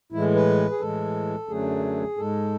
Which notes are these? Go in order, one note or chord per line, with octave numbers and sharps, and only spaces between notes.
A2 E3 G#3 E4
B4
G#4
A2 E3 G#3 A4
F#2 D3 F#3 A3 G#4
G#2 G#3 A4